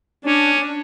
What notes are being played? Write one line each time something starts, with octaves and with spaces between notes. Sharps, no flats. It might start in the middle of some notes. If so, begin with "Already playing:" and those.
C#4 D4